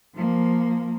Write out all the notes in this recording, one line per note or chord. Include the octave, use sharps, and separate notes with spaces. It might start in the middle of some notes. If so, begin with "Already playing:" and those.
F3 A#3